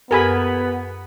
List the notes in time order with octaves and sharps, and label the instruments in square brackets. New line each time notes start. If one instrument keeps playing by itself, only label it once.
[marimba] F#2 G4 A4 [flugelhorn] B3 [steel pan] A#4 G#5 B5